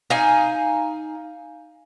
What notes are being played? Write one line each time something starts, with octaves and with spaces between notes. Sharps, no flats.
D#4 F5 G#5